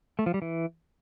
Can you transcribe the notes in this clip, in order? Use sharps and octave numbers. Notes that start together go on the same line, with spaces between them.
A3
F3
G3
E3